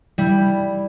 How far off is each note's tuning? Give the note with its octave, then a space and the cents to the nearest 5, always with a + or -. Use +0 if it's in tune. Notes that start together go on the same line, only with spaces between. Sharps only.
G3 +0 E4 +0